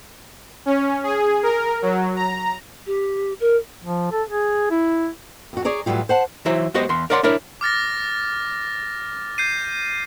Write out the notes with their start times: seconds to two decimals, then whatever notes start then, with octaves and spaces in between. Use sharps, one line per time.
0.66 C#4
1.03 G#4
1.43 A#4
1.82 F#3
2.16 A#5
2.86 G4
3.40 A#4
3.83 F3
4.12 A4
4.29 G#4
4.70 E4
5.53 F2 F#4
5.65 G#4 C#5 D5 A#5
5.86 A2 E3 F#3 G3 F4
6.09 C5 F#5 A5
6.46 E3 F#3 E4 C5
6.74 G#3 B3 F#4 G4 C5 D#5
6.89 E2 C6
7.10 A#4 C#5 D5 F#5 B5 C6
7.23 D4 E4 A#4 C#5
7.61 D6 F6 A6 A#6
9.38 G6 C7 D#7